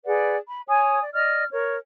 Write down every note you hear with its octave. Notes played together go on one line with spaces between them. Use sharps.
G#4 B4 D5 F#5
B5
C#5 G#5 D#6
D5
D5 D#5 F6
A#4 C#5